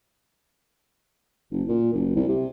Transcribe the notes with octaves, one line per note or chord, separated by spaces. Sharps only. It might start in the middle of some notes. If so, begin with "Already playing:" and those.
F#1
A#2
F#1
C2
C3